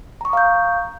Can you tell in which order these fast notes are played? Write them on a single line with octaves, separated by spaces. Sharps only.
A#5 C#6 D#6 F5 G6